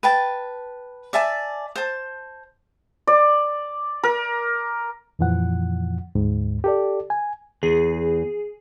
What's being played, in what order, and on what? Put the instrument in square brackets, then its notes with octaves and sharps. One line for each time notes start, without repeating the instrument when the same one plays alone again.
[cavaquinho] B4 G5 A5
D5 E5 G#5 A5
C5 A5
[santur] D5
A#4
[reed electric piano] F2 A#2 E3 F3 F#5
D2 G#2
G4 A4 D5
G#5
[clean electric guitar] E2 [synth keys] G#4